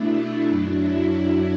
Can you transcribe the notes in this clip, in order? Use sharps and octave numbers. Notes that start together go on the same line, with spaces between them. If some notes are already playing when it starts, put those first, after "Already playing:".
Already playing: B2 A3 D4 E4
F#2 F#3 D4
E4